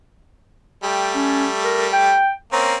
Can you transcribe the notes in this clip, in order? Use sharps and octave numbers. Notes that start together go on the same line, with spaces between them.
G3 A3 G5
C#4
A#4
G5
A#3 C4 C#4 A#5